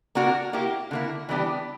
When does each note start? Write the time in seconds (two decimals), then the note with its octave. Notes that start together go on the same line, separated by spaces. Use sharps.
0.15 A#3 D4 F#4 A#4
0.53 A#3 E4 G4
0.91 D3 A#3 E4
1.29 E3 G3 B3 D4 G4